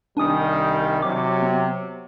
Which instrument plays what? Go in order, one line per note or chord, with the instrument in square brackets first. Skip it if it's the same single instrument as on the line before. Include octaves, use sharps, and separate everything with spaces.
[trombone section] C2 D#3 G3 [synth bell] D4 G#5 D#6
[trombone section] C3 F#3 [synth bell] D6
[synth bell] B3